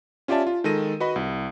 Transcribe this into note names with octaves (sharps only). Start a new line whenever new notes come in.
C#4 F4 G4 D5 E5 A5
F4
D#3 G#3 A4 A#6 D#7
F#4 B4 D#5 B5
C2